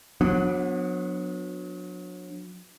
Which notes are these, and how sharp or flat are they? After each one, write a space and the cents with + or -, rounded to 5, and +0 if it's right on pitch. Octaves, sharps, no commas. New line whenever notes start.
F#3 -35 B3 +0 D4 +0